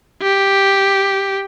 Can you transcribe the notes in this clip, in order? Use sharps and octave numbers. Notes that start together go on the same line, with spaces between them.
G4